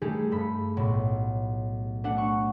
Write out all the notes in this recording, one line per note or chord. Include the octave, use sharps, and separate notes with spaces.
G3 A3 D#4 G4 G#4
G2 A4 B5
B1 A2
A3 D4 F#5
C#6